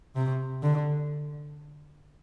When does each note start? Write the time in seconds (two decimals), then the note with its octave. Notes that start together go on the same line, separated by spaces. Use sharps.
0.15 C3
0.63 D3